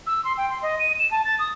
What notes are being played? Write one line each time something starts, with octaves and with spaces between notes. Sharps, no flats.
E6
C6
G5
C6
D#5
D#7
E7
A5
A6
D#6